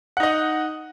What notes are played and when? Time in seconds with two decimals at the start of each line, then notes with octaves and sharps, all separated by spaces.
0.17 F#5
0.20 D#4
0.23 D#5